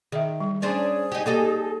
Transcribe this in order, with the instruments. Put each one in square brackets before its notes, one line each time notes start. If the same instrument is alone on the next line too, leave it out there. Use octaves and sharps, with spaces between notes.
[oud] D#3 [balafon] G#4 E5
[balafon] G3
[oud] C#4 D4 C5 [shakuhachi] G#4
[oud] D#4 G4
[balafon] A#3 G4 [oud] D#4 A4 D#5